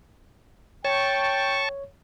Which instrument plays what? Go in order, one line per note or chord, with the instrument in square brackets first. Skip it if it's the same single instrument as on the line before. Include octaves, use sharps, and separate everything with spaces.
[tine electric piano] C#5 [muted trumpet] G5 [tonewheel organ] A5 C#6